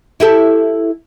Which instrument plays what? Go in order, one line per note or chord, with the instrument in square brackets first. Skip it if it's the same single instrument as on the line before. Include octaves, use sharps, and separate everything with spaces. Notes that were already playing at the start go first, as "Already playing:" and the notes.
[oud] E4 G4 A4